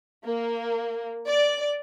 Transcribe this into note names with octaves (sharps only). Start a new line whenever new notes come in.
A#3
D5